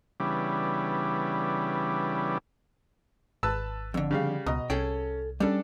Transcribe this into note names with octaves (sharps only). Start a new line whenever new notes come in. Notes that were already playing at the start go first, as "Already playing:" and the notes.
C#3 E3 G3 B3 D4
G#1 B4 A5 E6
F2 D3
C#3 G3 F5
C#2 B2 D#5 A#5 D#6
C2 C#4 G#4 A4 G5
G3 C#4 D4 A4